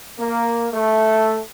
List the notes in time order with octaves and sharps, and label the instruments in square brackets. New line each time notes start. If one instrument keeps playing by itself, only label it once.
[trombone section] A#3
A3